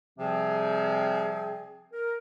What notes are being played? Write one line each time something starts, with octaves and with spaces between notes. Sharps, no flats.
C3 F3 G3 C4 G#4
A#4